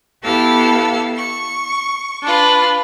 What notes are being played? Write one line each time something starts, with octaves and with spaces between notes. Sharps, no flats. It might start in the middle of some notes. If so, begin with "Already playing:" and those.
B3 E4 G4 A4 F5 E6
C#6
D4 F4 B4